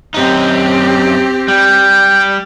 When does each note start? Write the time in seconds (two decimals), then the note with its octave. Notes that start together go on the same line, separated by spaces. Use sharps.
0.14 F#2 C4 D#4 G4
1.48 G3 G5